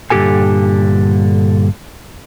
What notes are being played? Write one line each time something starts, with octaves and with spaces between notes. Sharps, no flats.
G2 A#2 D3 G4 A4 G#5